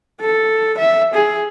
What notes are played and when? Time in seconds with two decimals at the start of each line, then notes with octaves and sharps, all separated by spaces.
0.20 A4
0.78 E5
1.14 G#4